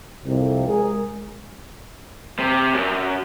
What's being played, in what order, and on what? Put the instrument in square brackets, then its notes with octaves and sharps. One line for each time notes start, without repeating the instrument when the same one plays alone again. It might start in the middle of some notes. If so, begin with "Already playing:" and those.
[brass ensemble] C2 F2 C3
G#3 G#4 A#4
[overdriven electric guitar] C3
F#2